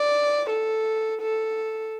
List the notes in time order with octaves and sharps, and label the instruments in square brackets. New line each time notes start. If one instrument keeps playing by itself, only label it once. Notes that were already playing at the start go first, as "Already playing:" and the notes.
Already playing: [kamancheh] D5
A4
A4